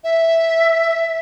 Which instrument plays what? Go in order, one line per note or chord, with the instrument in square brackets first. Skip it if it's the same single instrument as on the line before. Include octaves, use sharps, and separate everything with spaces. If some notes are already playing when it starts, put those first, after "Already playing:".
[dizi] E5